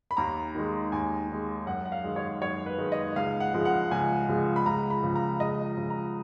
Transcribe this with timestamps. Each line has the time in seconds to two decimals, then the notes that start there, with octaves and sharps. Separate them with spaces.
0.11 B5
0.17 D#2 A#5
0.55 D#3 G#3
0.92 D#2 G#5
1.29 D#3 G#3
1.66 F#2 F#5
1.85 F#5
1.92 F5
2.04 D#3 G#3
2.16 C#5
2.42 F#2 C#5
2.66 B4
2.78 D#3 G#3
2.92 D#5
3.16 C#2 F5
3.40 F#5
3.54 C#3 F3 G#3
3.65 F#5
3.91 C#2 G#5
4.29 C#3 F3 G#3
4.56 B5
4.66 C#2 A#5
4.90 B5
5.03 C#3 F3
5.16 A#5
5.40 C#2 D#5
5.77 C#3 F3
5.90 A#5